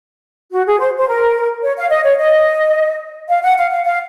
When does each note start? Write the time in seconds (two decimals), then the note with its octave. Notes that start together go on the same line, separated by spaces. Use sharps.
0.52 F#4
0.66 G#4
0.80 C5
0.97 C5
1.08 A#4
1.63 C#5
1.77 F5
1.90 D#5
2.04 C#5
2.18 D#5
3.29 F5
3.42 F#5
3.57 F5
3.70 F5
3.84 F5